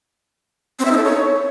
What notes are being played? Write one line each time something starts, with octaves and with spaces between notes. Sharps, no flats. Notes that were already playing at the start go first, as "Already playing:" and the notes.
C4
E5
D#4
A4
C#5